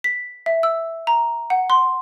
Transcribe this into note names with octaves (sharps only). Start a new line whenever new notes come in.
B6
E5
E6
A#5
F#5
C6